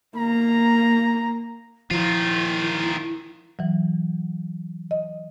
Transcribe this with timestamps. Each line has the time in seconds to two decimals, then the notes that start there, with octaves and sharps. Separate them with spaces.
0.16 A#3 A#5
1.91 D#3 F3 E4 F4
3.59 E3 F#3
4.91 D#5